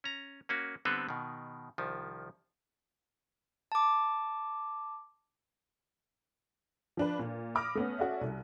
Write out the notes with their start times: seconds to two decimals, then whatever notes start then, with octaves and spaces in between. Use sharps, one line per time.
0.04 C#4 A#5
0.49 A#3 C#4 F#4
0.85 D3 G3 B3 C4 A4 B4
1.09 B2 D#3
1.78 C2 D#3 F3
3.72 A5 D6
6.97 F3 D4 B4
7.19 A#2
7.55 B5 D6 D#6 F6 A#6
7.75 A3 B3 C#4
7.99 C#4 F#4 A4 D5 E5
8.21 C2